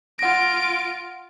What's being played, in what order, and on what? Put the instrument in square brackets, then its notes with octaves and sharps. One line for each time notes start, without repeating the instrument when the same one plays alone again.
[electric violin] F4 D7 [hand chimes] F#5 A#6